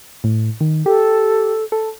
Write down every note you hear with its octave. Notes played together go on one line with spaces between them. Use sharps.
A2
D#3
G4 A4
A4